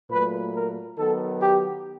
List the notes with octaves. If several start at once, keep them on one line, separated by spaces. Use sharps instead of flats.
A#2 F#3 A3 B4
A#4
D#3 F#3 B3 A4
G4